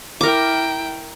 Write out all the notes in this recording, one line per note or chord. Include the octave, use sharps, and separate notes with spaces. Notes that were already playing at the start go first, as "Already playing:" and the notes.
E4 A#4 G5 D6